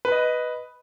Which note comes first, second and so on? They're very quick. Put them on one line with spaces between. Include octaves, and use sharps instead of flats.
B4 B5 D#5